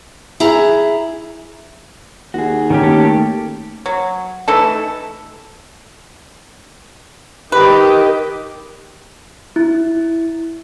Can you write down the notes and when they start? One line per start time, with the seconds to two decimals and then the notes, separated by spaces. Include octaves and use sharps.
0.40 E4 G#4 A#5
2.34 D#2 F#4 G#4
2.70 D#3 C#4 G4
2.83 A3 A#3 A4
3.86 F#3
4.48 E3 A3 D#4 A4
7.52 D#3 G4 B4 D#5
9.56 E4